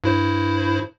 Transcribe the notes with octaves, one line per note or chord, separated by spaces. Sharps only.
G2 E4 C5